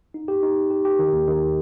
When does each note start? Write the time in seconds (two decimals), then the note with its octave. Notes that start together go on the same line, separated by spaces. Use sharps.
0.14 D#4
0.28 G4
0.43 D#4
0.56 D#4
0.70 G4
0.85 G4
0.99 D#3
1.13 D#2
1.27 D#3